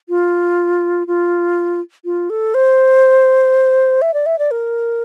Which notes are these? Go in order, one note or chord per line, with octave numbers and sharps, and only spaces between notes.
F4
F4
F4
A4
C5
E5
D5
E5
D5
A#4